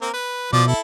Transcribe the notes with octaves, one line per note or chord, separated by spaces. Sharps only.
A#3 C4 A#4
B4
B2 F3 D5
E4 A4